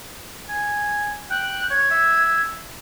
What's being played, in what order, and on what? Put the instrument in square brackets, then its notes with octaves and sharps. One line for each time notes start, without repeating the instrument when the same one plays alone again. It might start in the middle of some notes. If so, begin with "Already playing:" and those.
[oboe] G#5
[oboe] G5 [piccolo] F#6
[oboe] C#5 [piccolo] G#6
[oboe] E5